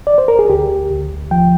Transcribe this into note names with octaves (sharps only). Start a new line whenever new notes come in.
D5
C5
A#4
G#4
D2 G4
D2
F3 G5